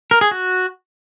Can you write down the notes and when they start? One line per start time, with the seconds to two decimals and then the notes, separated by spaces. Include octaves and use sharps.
0.11 A#4
0.21 G#4
0.31 F#4